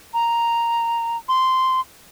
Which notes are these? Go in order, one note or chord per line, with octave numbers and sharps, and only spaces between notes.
A#5
C6